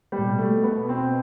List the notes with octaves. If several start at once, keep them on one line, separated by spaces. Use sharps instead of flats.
G3
A2
B2
A3
B3
C4